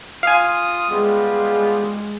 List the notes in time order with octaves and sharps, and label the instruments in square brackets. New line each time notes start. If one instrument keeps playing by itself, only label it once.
[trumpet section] F4 D#6 [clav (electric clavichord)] F5 G#5
[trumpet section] G3 B3 F4 [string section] G#3